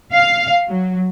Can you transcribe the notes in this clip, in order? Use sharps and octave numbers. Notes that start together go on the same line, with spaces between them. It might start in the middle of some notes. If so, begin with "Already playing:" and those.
F5
F#3